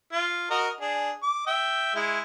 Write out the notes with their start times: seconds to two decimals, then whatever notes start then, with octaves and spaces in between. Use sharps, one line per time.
0.13 F4
0.50 F#4 A#4 D#5
0.80 D4 G#4
1.23 D6
1.47 E5 G5
1.95 G#3 E4